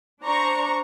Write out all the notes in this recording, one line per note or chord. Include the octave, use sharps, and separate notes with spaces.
D4 C5 A#5 C#6